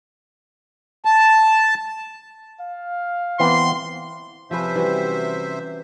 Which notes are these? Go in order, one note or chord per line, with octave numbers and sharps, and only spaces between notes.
A5
F5
E3 B3 C4 C6
C3 F3 C#4 B4 C5 E5
E3 G3 F#4